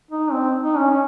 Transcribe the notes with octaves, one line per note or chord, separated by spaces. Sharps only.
D#4
C4
D#4
C#4
C#4